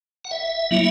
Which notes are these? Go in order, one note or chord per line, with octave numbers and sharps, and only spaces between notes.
F#5
E5
F#3 A#3 E4